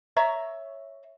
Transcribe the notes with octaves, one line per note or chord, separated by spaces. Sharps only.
C#5 E5 A#5